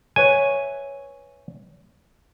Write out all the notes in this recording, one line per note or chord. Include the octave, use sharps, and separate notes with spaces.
B4 C#5 E5 G#5